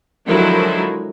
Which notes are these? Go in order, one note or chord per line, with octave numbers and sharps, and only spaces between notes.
D3 D#3 F3 F#3 G#3 E4